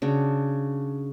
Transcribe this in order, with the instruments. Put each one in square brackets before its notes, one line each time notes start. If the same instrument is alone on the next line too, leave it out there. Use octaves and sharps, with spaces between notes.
[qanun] C#3 D4 F#4